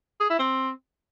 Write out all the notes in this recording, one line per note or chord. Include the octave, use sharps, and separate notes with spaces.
G#4
E4
C4